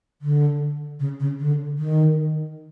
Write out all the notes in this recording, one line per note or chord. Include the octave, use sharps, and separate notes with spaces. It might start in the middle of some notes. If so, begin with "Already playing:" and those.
D3
C#3
C#3
D3
D#3